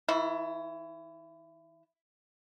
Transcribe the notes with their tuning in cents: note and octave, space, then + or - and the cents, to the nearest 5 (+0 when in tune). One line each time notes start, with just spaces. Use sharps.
E3 -40 E4 +25